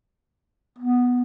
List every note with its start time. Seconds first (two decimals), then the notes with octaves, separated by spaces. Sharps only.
0.79 B3